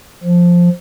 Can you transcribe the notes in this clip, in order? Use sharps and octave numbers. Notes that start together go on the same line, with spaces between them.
F3